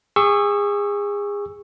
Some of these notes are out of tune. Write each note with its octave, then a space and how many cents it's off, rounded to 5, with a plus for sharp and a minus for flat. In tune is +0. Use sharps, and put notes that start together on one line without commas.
G#4 -30 C#6 +0 E6 +5